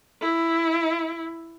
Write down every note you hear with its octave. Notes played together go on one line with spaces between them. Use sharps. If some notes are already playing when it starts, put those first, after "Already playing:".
E4